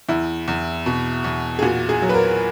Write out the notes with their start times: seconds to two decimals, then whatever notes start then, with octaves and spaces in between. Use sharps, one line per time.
0.09 E2 E4
0.48 E2
0.86 B2
1.24 E2
1.59 G#4
1.62 A#2 F#4
1.89 G#4
2.02 F#3
2.09 B4
2.14 A#4